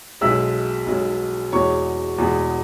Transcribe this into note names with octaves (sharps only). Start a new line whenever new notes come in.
B1 B2 G#3 E5 E6
B1 B2 G#3
E2 B2 G#3 C#5 C#6
E2 B2 G#3